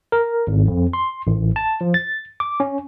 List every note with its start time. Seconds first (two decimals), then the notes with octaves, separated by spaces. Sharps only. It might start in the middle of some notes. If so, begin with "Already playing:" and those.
0.12 A#4
0.47 G#1
0.68 F2
0.93 C6
1.27 A1
1.56 A5
1.81 F3
1.94 A6
2.40 D6
2.60 C#4